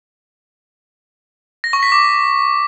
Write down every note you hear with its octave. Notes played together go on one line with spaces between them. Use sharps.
A#6
C#6
B6
D6